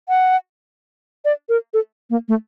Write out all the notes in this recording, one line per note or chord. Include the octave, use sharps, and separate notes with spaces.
F#5
D5
A#4
A4
A#3
A3